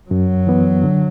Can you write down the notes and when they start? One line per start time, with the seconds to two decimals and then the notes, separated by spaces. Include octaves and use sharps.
0.10 F#2 F#3
0.47 E3 B3
0.84 D3